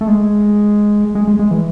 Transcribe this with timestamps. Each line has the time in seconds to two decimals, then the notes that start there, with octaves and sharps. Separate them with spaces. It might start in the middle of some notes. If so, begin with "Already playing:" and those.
0.01 A3
0.07 G#3
1.15 G#3
1.28 G#3
1.39 G#3
1.51 E3